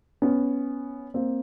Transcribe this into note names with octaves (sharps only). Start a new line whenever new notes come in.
B3 C#4
A#3 C4